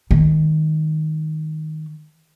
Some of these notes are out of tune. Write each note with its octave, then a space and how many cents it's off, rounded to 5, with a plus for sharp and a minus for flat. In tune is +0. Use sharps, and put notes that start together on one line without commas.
D#3 +0 G#3 +0